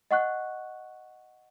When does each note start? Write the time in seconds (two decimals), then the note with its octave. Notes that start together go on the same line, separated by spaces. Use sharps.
0.11 D#5 F#5 C#6 F#6